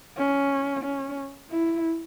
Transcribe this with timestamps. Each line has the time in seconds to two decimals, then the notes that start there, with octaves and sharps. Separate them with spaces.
0.17 C#4
0.84 C#4
1.51 E4